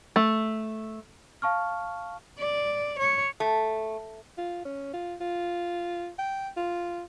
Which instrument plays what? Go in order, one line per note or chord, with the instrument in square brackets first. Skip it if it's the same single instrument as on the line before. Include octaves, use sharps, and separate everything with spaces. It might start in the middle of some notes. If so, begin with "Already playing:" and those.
[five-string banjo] A3
[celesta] F5 A5 C#6 F6
[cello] D5
C#5
[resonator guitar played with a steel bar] A3
[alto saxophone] F4
C#4
F4
F4
G5
F4